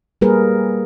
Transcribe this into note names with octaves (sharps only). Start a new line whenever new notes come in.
G3 A#3 G#4 A#4 B4